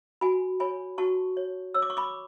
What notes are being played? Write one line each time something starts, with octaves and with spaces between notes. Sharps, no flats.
F#4 G#5 B5
C#5 G#5 B5
F#4 A5 C#6
C#5
C#5 E6
D6
C#6
B5 D6